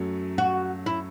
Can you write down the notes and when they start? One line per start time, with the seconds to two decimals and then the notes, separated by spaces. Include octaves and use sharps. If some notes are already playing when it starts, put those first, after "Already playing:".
Already playing: F#2 F#3 A3
0.38 F#4
0.86 E4